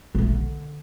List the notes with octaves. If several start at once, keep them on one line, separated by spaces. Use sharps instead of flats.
A#1 A3
D3